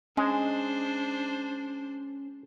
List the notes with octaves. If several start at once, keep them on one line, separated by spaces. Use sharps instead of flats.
G#3 C#4 D4 C5